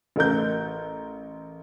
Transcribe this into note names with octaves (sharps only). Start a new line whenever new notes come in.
A1 A3 A#4 G6